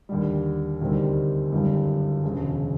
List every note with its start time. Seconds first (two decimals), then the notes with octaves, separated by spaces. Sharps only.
0.09 D#2 D3 G3
0.81 D2 C3 D#3 G3 C4
1.52 G1 F#2 D#3 G3
2.23 E1 D2 C#3